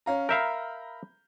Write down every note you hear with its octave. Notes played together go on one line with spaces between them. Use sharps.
C#4 F5 A#5
A#4 E5 F5 A#5 B5 G6